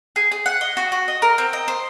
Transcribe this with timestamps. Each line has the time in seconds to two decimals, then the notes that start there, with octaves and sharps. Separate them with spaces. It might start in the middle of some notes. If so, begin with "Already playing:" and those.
0.16 G#4
0.32 G#4
0.46 F#5
0.61 D#5
0.77 F#4
0.92 F#4
1.08 D#5
1.22 A#4
1.38 C4
1.53 D#5
1.68 C5